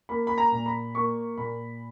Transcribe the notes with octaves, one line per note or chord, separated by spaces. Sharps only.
A#3 B5
B5
A#5
A#2
B5
A#3 C#6
A#2 B5